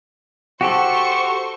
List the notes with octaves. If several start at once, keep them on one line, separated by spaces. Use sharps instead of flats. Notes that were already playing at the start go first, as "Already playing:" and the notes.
F#4 G4 A4 C5 C#6